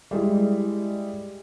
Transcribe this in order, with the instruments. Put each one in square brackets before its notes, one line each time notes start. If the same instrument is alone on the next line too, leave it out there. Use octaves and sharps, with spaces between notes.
[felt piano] G3 G#3 E4